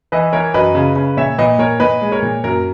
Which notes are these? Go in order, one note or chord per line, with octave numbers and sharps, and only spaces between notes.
E3 B4 D#5
E3 A#4 C#5
F#2 B4 D#5
C#3
C#3
A#2 C#5 E5
A#2 B4 D#5
A#2 A#4 C#5
A#2 B4 D#5
G#3
A#4 C#5
A#2
F#2 A#4